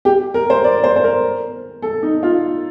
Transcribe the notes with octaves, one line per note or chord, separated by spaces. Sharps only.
G4
A#4
C5
D5
C5
C5
A#4
A4
D#4
F4